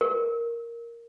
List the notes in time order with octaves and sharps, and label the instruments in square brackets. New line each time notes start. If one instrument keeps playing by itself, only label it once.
[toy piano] A#4